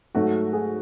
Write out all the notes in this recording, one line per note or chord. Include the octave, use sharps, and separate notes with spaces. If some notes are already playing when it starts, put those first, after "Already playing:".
G#2 F#3 A3 F#4
G#4